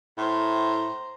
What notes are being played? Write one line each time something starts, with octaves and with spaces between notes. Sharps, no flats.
A2 C5 A#5